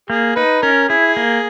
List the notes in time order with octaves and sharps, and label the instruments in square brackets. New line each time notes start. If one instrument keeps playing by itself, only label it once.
[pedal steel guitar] A#3 [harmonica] G#4
[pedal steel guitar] D#4 [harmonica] B4
[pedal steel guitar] C#4 [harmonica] A#4
[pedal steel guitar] E4 [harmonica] G#4
[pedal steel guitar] A#3